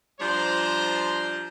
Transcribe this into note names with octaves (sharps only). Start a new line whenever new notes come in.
F3 G3 D4 C5 A#5